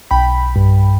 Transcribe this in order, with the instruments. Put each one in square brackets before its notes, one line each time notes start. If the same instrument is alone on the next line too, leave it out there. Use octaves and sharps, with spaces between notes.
[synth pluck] B1 G5 B5
G2